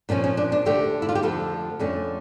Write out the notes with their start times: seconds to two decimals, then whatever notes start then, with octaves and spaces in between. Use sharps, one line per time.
0.09 A#2 F3 C#4 D4
0.24 C#4
0.37 D4
0.52 D4
0.65 D2 D3 A3 G4
1.02 E4
1.09 F4
1.15 G4
1.22 F2 D3 F3 A3 A4
1.79 F2 D3 A3 C#4